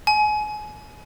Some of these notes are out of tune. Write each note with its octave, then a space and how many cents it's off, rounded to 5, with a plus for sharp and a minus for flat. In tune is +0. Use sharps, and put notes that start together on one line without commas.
G#5 +30